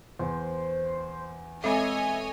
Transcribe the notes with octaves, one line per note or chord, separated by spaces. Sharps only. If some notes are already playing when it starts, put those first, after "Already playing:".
E2 C5
G#3 C4 A4 C#5 D#5 E5 G#5